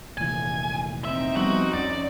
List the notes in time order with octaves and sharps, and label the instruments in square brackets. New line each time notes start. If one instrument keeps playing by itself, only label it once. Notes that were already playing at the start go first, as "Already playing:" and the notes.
[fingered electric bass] F1 A#2 E3 [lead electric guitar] G#5
[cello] C4 D#4 [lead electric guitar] E5
[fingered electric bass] F3 G3 B3 [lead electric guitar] F#4
[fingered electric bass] F2 C#4 [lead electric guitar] D5